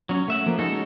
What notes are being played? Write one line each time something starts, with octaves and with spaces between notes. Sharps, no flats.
F#3 C#4
A3 E5 F#5
F3 A#3
G#3 C#4 D#4 F#4 A4